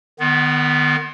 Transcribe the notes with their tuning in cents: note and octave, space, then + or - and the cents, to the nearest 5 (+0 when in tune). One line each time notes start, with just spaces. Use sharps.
D#3 -40 B3 +0